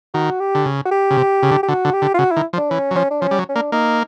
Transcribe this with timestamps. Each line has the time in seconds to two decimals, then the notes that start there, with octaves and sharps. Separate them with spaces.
0.14 D#3 F#4
0.40 G4
0.55 D3
0.66 C#3
0.86 F#4
0.91 G4
1.10 C#3
1.17 C3
1.43 C#3
1.51 D3
1.63 G4
1.68 D3 F#4
1.85 D3
1.93 G4
2.02 D3
2.14 F4
2.19 C#3 F#4
2.31 E4
2.36 D#3
2.53 F3
2.57 D4
2.70 E3 C#4
2.91 F#3
2.95 F3 C#4
3.11 D4
3.21 F3 C#4
3.31 G3
3.39 F#3
3.49 C#4
3.56 A#3 D4
3.72 A#3 D#4